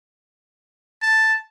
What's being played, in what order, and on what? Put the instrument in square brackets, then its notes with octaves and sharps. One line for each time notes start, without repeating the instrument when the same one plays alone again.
[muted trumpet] A5